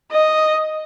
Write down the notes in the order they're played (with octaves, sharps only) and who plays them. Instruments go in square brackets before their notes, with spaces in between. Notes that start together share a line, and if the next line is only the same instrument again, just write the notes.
[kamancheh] D#5